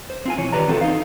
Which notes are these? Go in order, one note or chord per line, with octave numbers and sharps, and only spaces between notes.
C5
C4 F4 G#5
B1 E3 C#5
D#3 F4 G4 B4 D5 A#5
E3 B3 C4 F#4 A4
D#4 F5